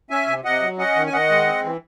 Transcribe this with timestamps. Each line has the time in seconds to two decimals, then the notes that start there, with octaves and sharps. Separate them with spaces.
0.10 C#4 E5 G#5
0.27 C3
0.44 C3 D#5 F#5
0.62 F#3
0.79 C#4 D#5 F#5
0.96 D#3
1.06 G#5
1.13 D#3 D#5 F#5
1.30 G#3
1.47 C4
1.64 E3